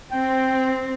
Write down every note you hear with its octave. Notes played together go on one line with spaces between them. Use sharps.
C4 G5